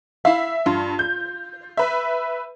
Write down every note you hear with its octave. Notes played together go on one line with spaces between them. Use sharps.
E4 E5 F5
G2 F4
G6
B4 E5